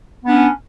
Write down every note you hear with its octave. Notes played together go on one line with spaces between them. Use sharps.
B3 C#4 D4